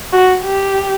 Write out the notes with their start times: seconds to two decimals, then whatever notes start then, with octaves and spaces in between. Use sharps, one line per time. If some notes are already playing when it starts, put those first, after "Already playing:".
0.13 F#4
0.44 G4